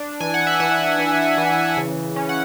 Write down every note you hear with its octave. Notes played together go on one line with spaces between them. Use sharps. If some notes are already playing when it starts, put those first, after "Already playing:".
Already playing: D4
E3 G#5
F#5
E5
E3 F#5
E3
E3
C#3
C#4
F#5